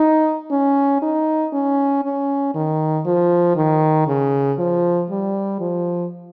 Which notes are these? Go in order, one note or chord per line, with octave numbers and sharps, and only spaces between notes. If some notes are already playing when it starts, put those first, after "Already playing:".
Already playing: D#4
C#4
D#4
C#4
C#4
D#3
F3
D#3
C#3
F3
G3
F3